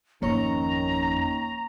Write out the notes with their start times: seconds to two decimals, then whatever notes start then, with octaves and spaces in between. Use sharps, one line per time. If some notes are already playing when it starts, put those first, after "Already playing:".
0.22 G#1 F2 D#3 A#3 C#4 C#5 A#5 C#6